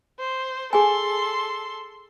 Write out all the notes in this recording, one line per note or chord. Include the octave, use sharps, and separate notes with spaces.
C5
G#4 A4 G#5 C6